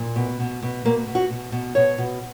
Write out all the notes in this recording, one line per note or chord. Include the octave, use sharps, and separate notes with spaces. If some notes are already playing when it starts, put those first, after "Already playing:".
Already playing: A#2
B2
B2
B2
B2 A#3
B2
F#4
B2
B2
B2 C#5
B2